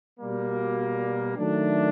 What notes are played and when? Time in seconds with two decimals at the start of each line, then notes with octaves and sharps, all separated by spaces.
0.19 B2 G3 A#3
1.36 D#3 F#3 A3 D4